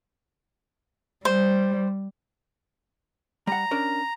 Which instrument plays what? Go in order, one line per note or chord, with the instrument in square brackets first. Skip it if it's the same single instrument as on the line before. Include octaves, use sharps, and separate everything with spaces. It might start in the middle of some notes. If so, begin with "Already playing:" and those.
[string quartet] G3 [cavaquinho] C5
[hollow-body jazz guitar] G3 F#5 [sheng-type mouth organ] A#5
[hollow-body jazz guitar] C#4 D4 A#4